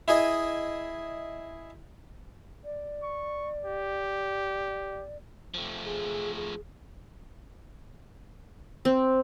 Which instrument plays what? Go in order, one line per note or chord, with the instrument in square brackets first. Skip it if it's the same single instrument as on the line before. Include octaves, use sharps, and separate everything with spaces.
[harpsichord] E4 G#4 D#5
[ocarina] D5
[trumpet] C#6
G4
[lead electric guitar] F3 A3 [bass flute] G4
[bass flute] G#4
G#4
[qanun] C4